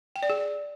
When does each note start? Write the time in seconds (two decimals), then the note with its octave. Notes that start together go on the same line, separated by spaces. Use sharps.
0.16 G5
0.23 D5
0.30 G#4